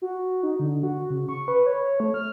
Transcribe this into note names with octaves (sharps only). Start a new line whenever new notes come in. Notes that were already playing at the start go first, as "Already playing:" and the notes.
F#4
D#4
D3
F#4
C#3
C#6
B4
C#5
A3
F6